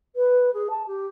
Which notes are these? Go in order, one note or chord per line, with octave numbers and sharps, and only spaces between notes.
B4
G#4
A5
G4